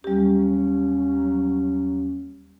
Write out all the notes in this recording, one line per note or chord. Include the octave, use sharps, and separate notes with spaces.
D#2 F#3 G3 C#4 G4